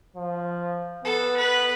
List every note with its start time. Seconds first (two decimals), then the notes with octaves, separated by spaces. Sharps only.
0.16 F3
1.04 B3 A4
1.36 B4